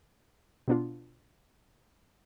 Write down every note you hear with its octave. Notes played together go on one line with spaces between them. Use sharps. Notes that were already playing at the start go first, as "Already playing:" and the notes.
B2 B3 D4 F4